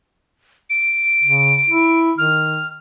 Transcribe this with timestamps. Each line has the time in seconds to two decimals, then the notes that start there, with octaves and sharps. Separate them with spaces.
0.70 D7
1.23 C#3
1.70 E4
2.18 D#3 F6